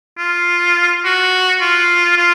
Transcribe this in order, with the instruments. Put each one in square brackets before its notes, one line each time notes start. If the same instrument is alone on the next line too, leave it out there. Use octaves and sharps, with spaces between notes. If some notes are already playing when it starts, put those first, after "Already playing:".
[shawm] F4
F#4
F4
F4